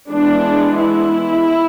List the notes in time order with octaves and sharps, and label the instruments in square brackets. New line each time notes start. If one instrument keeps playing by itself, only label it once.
[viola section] E3 G#3 B3 D4
E4